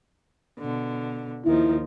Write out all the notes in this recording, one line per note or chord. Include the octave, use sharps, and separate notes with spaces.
B2 D3
D#2 D#3 F3 E4